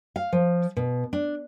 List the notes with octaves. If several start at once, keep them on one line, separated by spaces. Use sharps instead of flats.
F5
F3
B2
D4